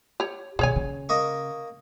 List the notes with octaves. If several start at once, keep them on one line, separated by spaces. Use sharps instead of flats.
G4 C#5
B2 D#3 G#4 C#5 G#5
C#3
A#3 D#5 C#6